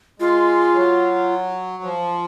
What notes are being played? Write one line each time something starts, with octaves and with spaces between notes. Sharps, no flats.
G#3 F4
F#3
F3